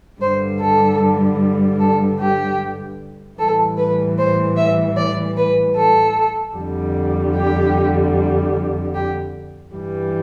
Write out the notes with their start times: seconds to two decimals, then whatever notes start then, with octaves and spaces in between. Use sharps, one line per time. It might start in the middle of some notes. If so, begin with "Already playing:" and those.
0.20 G2 D3 G3 C5
0.60 A4
1.79 A4
2.19 G4
3.38 A2 E3 G3 A4
3.77 B4
4.18 C5
4.57 E5
4.97 D5
5.37 B4
5.77 A4
6.56 F2 D3 G3
7.35 G4
8.95 G4
9.74 G2 E3 G3